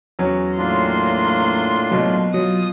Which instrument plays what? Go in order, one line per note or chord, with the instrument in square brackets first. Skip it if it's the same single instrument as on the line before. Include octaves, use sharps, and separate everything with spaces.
[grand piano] E2 F#3 C#4
[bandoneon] A2 D4 F4 [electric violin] A#3 C6
[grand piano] B2 [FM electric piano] F#3
[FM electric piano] F#3 [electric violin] F4 D#6